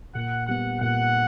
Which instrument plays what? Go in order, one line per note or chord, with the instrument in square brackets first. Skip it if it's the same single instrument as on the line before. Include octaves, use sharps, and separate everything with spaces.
[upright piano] A#2 [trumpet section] F#5
[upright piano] G3 B3 [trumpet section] F#5
[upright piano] A#2 [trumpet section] F#5